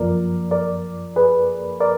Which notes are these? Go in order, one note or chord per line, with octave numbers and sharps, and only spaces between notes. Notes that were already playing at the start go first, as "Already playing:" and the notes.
Already playing: F#2 F3 A#3 A#4 D5
A#4 D5
G#4 B4
A#4 D5